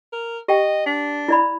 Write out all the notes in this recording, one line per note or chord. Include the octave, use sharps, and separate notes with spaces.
A#4
G4 D#5 G5
D4
E4 D5 B5